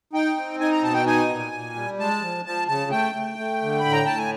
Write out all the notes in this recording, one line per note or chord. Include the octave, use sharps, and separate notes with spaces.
D#4 G5
C4
D#4 G#5
A#5
B2 A5
G5
D#4 G#5
A#2
A#2
G3
G#3 A5
F3
F3 A5
C#3 A5
A3 G5
A3
A3
D3
B5
A2
A#5
A2 A5
G#5